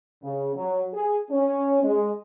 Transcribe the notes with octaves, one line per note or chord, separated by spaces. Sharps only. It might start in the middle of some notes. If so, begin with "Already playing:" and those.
C#3
F#3
G#4
C#4
G#3